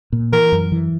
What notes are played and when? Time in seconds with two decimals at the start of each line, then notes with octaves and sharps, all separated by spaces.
0.13 A#2
0.32 E3 A#4
0.52 F#2
0.72 E3